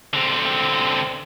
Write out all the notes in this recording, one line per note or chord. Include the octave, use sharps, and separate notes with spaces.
D3 C4